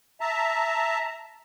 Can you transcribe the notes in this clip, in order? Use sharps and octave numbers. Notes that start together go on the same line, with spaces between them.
E5 A5 A#5